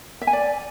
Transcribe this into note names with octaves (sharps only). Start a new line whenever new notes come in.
E5
G#5
D5